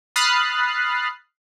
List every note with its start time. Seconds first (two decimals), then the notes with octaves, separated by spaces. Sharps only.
0.16 B5 D#6 F6 F#6 A6 C7